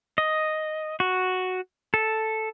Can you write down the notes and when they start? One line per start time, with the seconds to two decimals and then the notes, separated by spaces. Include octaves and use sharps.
0.18 D#5
1.00 F#4
1.94 A4